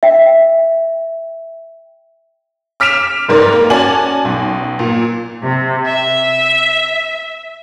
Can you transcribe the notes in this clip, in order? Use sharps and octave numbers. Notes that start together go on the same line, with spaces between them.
E5 G5
D6 F6 B6 D7 E7 F7
F1 G#2 A#4 D5
A#3
C#4 F#4 D5 G#5 A5 F#7
B1
A#2
C3
E5